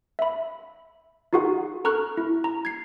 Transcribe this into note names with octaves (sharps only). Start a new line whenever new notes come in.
E5 B5
D#4 F4 F#4 G#4 F#5
A4 A#5 C#6 F6 F#6
E4
A#5
G#6 C7